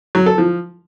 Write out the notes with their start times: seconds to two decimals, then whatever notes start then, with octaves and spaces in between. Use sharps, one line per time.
0.15 F#3
0.26 A4
0.38 F3